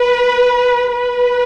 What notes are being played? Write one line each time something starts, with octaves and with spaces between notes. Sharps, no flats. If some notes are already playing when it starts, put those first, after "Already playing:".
Already playing: B4
B4